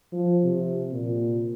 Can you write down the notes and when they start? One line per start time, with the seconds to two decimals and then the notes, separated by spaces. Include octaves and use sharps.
0.13 F3
0.44 C3
0.93 A#2